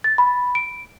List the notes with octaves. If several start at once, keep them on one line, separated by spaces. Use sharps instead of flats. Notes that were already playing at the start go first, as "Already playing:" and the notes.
A6
B5
D7